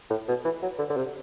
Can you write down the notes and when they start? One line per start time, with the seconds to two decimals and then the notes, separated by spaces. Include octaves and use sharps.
0.10 A2
0.28 B2
0.45 E3
0.62 F#3
0.78 D3
0.90 D3
0.97 C3